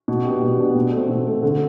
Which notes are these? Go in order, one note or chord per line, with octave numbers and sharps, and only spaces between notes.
B2
B3 D4 G4
B2
B3 D4 G4
B2
A3 C4
B2
A3 C4
D3